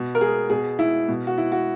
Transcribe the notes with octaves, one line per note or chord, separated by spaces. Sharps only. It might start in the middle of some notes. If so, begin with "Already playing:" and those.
Already playing: B2
A#4
G#4
B2 G#4
E4
B2
F#4
E4
F#4